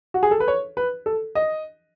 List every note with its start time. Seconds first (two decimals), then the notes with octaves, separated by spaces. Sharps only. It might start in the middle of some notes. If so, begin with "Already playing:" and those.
0.14 F#4
0.23 G#4
0.31 A4
0.40 B4
0.48 C#5
0.77 B4
1.06 A4
1.35 D#5